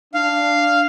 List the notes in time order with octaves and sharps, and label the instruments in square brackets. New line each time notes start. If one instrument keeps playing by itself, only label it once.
[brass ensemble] D4 [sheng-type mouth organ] F5